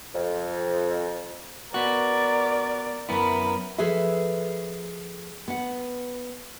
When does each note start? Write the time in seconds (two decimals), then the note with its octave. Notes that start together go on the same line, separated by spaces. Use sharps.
0.14 F2
1.74 B3 F#4 A#4 D5
3.09 F#2 B3 E4 A#4 B5
3.78 F3 G#4 A4 B4 E5
5.48 B3 F#5